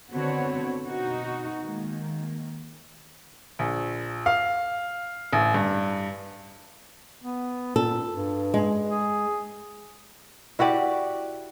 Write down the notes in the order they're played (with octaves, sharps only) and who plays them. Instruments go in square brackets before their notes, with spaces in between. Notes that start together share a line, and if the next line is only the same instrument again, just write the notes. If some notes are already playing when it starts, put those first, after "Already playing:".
[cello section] D3 B3 C4 F#4 B4 C#5
B2 D#4 F#4
D#3 G#3 A#3
[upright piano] A#1
F5
A1
G2
[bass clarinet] B3
[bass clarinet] A#2 [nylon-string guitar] A4
[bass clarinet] G2
[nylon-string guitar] G#3
[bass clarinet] G#4
[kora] E4 F#4 G4 D5